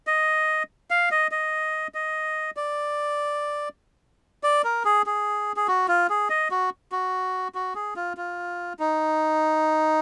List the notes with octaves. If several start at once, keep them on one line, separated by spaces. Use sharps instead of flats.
D#5
F5
D#5
D#5
D#5
D5
D5
A#4
G#4
G#4
G#4
F#4
F4
G#4
D#5
F#4
F#4
F#4
G#4
F4
F4
D#4